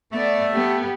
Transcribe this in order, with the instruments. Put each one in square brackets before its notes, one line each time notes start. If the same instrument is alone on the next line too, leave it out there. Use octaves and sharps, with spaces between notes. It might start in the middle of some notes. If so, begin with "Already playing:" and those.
[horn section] A3 [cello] B3 D5
[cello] B3 G4